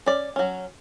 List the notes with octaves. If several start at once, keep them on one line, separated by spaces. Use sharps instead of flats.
C#4 D5
F#3 C#4